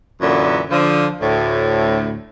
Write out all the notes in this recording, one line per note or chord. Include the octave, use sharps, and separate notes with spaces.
F#2 A#2 D3 E3
D3 F3
D2 A2